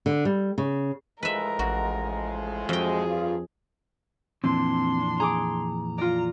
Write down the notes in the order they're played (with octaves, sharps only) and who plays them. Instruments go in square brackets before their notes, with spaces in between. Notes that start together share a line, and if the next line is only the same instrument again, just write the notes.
[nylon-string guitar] D3
G3
C#3
[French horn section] A2 F3 G#3 [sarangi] A#4 [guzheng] B4 E5
[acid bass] A1 [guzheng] F#4
[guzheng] F2 G5 [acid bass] F#4 [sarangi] G#4
[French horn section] G2 F4
[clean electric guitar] F2 A#2 E3 [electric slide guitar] C4 [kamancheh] D4 C6
[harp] G#4 D6 [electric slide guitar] A#5
[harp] F4 D5 [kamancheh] A#5